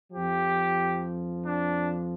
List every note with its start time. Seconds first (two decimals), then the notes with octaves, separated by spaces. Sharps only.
0.12 F2 F3 G4
1.45 D4